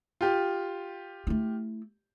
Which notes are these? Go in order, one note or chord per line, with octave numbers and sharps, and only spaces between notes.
F4 G4
A3 E4